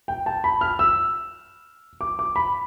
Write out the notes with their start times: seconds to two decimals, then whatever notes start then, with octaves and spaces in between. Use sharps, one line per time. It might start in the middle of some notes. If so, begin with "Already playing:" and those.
0.08 G5
0.26 A5
0.44 B5
0.61 F6
0.79 E6
2.01 D6
2.19 D6
2.36 B5